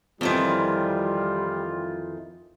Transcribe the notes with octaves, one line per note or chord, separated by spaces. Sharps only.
F2 D#3 E3 G3 F4